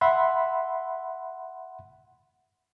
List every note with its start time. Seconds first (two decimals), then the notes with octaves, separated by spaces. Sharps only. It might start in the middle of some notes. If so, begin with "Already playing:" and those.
0.01 E5 F#5 B5 C6